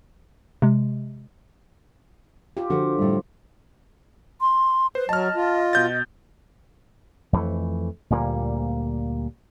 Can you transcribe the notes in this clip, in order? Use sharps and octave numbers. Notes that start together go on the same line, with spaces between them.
C3 G#3
F4 G4
D3 F3 F#4
A2 G3
C6
B4 C5
F#3 D#5 A5 F6
F4
B2 G6 A6
F2 E3 A3
D2 A#2 G3 A#3